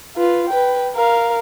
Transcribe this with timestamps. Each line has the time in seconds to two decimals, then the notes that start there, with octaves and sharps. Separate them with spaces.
0.17 F4 B4
0.49 B4 G5
0.96 A#4 F5